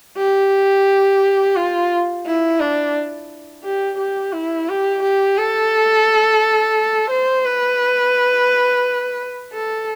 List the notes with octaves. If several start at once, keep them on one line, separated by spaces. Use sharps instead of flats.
G4
F4
E4
D4
G4
G4
E4
G4
G4
A4
C5
B4
A4